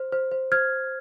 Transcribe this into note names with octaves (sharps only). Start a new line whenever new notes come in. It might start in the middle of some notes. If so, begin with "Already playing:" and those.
Already playing: C5
C5
C5
C5 F6 G#6